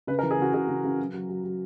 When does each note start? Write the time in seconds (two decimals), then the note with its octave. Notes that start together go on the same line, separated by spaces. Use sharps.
0.07 C#3 B4
0.19 A#4
0.23 E3
0.31 G#4
0.38 C#3 F#4
0.53 C#3 G#4
0.68 C#3
0.84 C#3
0.99 F#3
1.14 F#3
1.29 F#3
1.44 F#3